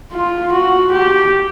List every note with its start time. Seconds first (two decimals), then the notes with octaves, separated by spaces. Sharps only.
0.13 F4
0.52 F#4
0.92 G4